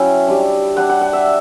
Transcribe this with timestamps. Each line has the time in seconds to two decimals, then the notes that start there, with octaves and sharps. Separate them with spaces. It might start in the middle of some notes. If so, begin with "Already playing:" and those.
Already playing: F#3 C#4 E4 E5 G5
0.28 G3 D4
0.77 G3 D4 F#5
0.89 F#5
1.01 F#5
1.13 E5